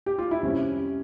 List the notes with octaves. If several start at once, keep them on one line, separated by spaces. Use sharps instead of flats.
G4
F4
E4
F2 C3 G3 C#4